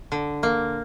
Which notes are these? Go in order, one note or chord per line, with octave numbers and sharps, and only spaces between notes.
D3
A#3